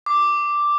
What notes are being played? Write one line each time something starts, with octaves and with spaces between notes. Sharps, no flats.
D6